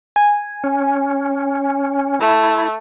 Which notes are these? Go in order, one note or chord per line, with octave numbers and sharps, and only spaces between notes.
G#5
C#4
A3 E4